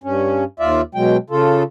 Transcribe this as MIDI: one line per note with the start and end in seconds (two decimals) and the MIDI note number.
0.04 0.44 43
0.04 0.44 61
0.60 0.81 39
0.60 0.81 65
0.60 0.81 74
0.60 0.81 76
0.95 1.17 47
0.95 1.17 54
0.95 1.17 56
0.95 1.17 79
1.30 1.63 49
1.30 1.63 65
1.30 1.63 69